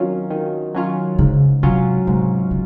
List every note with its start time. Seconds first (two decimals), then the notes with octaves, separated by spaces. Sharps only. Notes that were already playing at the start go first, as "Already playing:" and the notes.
Already playing: D#3 F#3 C4 C#4 F4
0.30 D#3
0.74 F#3 C#4 F4
1.19 G#2 C#3
1.63 C3 F#3 C#4 F4
2.07 G#2 C3
2.51 C#3